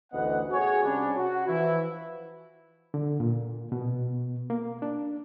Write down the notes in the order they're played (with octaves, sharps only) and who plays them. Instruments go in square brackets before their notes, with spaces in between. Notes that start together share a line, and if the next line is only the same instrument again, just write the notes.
[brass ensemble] A1 D2 B3 D#5 F#5
F#4 G#4 C#5
C3 G3 C#4 D4
F#4
E3 F3 E4
[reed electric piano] D3
A#2
B2
A#3
D4